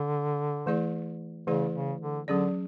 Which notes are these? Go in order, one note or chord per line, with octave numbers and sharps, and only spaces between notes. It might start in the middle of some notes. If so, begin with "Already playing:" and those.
Already playing: D3
E3 A3 E4 G#4 D5
C#3 E3 A3 E4 G#4 D5
C#3
D3
D3 F#3 C#4 G#4 D5